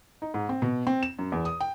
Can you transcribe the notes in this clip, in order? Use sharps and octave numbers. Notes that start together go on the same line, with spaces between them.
D#4
G#2
C4
B2
C4
E7
F#2
E2
D#6
G5